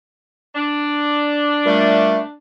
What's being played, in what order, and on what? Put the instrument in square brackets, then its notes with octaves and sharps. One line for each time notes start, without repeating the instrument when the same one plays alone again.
[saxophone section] D4
[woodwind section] A#2 G3 A3